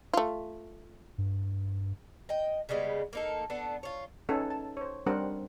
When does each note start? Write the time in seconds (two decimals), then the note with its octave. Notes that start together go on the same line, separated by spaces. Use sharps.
0.14 A3 F4
1.18 G2
2.29 D#5 G5
2.69 C#3 G3 G#3 B3
3.13 A#3 D#4 A4
3.50 B3 D4 A4
3.83 F4 C#5
4.29 C#4 D#4 A4 B4 F#5 G#5
4.50 A5
4.77 C5 C#5
5.06 G3 C4 D4 A#4 C5 F#5